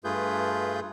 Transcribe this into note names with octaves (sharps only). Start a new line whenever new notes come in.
G2 A3 F4 G#4 B4 G6